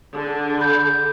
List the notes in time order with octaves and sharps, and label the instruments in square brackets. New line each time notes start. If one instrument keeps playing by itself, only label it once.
[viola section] D3 G#4
[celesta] B5 G6